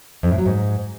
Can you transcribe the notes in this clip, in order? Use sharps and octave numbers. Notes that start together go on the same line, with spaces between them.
F2
A2
F#3
G#2